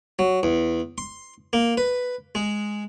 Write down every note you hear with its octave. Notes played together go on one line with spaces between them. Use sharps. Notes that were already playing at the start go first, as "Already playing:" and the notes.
F#3
E2
C6
A#3
B4
G#3